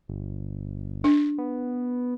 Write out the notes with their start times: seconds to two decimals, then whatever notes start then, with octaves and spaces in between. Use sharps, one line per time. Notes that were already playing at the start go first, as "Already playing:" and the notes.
0.08 G1
1.04 D4
1.38 B3